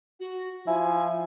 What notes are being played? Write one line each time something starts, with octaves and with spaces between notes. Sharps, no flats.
F#4
F3 E4 G#5